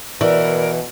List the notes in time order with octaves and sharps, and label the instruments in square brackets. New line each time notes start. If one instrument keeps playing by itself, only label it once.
[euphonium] B2 [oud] E3 [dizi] A#4 [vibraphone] D5